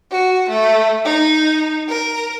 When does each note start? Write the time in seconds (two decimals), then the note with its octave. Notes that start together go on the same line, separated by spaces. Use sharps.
0.11 F#4
0.49 A3
1.05 D#4
1.88 A#4